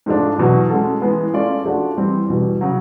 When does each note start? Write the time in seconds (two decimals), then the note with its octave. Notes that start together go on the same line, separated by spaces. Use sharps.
0.06 G#2 F3 A3 D4
0.38 E2 B2 F#3
0.70 G#3 C#4 F#4 A4
1.02 E3 G#3 B3
1.33 G#3 C#4 F4 A4 D5
1.65 F3 A3 D4 F#4
1.97 E3 G3 C4 E4
2.29 E2 B2 G3
2.61 C#3 F#3